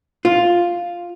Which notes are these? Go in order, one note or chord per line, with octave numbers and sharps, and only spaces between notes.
F4